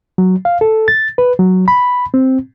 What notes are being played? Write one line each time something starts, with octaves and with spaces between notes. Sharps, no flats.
F#3
F5
A4
A6
B4
F#3
B5
C4